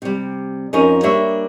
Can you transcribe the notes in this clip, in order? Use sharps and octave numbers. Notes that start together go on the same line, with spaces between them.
C3 G3
F2 C#4 D#4 F4 A#4 G#5
G3 A#3 D4 C#5 E5